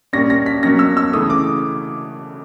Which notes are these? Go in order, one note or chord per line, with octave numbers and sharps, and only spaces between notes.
A#2 G3 A#3 C#4 A#6
A#6
B6
B2 F#3 A#3 C#4 A#6
E6
E6
C#3 E3 A3 D#6
D6